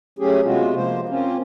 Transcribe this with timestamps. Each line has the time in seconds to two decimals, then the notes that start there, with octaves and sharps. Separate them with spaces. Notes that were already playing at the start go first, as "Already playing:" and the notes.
0.19 F#3 A3 C#4 G4 G#4
0.44 C3 G#3 B3 F4 F#4
0.76 F3 A#3 C5
1.09 A#3 C4 C#4 F4